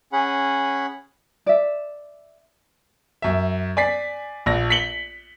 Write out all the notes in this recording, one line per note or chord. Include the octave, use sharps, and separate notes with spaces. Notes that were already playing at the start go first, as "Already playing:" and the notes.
C#4 G#4 F#5 B5
D5 E5
F#2 E5
D5 G#5 A6 B6 C7
A#1 A#6
B6 C#7 F#7 G7